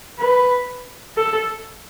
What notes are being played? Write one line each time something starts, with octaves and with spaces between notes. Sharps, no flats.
B4
A4